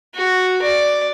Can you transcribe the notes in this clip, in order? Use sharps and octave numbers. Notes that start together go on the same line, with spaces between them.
F#4
D5